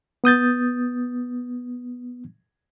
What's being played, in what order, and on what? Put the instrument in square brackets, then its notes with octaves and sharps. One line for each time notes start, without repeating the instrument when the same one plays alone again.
[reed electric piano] B3 D#6 G6 A6